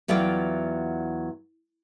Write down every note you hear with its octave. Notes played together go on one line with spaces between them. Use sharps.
E2 F#3 E4 F4 D5 G5